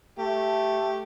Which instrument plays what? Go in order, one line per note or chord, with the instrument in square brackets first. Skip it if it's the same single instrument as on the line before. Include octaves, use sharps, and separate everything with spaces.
[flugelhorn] A3 [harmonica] G4